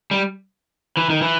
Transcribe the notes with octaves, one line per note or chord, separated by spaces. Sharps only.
G3
E3
D#3
E3